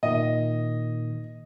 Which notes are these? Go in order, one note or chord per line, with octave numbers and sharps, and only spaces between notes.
A#2 D#3 D#5